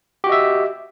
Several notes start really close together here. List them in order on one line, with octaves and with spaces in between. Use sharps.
G4 F#4 D#5 E5